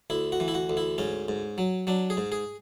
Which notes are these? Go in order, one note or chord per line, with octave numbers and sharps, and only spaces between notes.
D2 E4
F#4
E3
E4
F#4
D2
E4
G#2 C#4
G#2
F#3
F#3 D4
G#4
G#2
G#4